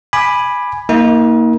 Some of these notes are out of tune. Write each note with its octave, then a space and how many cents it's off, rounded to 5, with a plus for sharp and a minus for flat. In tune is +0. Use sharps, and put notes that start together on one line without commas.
G#5 +0 B5 +0 D6 +25
A#3 +0 D#4 +40